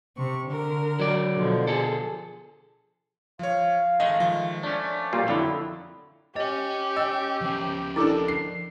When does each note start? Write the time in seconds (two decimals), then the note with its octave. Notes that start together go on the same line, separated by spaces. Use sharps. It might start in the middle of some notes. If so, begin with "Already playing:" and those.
0.17 C3 C#6
0.48 D3 A#4
1.00 F#3 D5
1.33 B2 D3 F3
1.67 G#4 A4
3.39 F3 C#5 F5
4.00 D#3 G#3 A3 D#5
4.20 F3
4.63 A3 C#4 D4 D5
5.13 A#2 G3 F4
5.28 F2 D3 F#3 E4
6.36 G4 C#5 D#5 G#5
6.97 D#5 E6
7.41 F3 C#4
7.96 D4 E4 A4 A#4 D6
8.28 C7